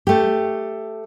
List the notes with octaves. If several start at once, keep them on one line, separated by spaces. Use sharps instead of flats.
A3 G4